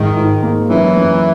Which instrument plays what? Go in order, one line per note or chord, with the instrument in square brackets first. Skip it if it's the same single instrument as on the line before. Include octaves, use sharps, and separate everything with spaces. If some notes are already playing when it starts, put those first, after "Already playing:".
Already playing: [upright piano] G#2 [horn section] D#3
[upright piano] G#2
A#3
[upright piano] F#2 [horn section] E3
[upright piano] F#2